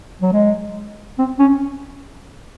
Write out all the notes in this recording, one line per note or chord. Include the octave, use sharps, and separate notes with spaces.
F#3
G#3
C4
C#4